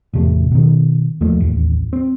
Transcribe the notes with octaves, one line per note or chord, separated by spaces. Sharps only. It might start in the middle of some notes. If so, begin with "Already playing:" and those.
A1 E2 C3 A3
B2 D#3
D#2 F3 A3 A#3
A1 D#2
C4